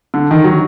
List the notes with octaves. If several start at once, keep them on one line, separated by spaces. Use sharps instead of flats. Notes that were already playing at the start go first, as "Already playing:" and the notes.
D3
D#3
F#3